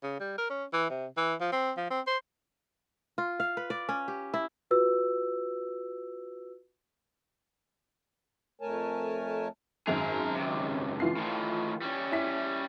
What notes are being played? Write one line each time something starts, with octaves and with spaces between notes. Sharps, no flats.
C#3
G3
A#4
C#4
E3
C3
E3
F3
C4
F3
C4
C5
F4
F5
B4
D5
C#4
G4
E4
F4 F#4 B4 E6
F2 A3 A#4 C#5 G#5 A5
G#1 F#2 G#4 A#4 F7
C#2 C3
E3 F4 C7
A2 D#3
G3 C#4
E4 E5 B6